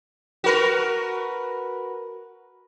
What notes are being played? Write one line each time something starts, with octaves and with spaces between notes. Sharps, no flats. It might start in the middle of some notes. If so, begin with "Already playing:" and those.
F#4 A#4 B4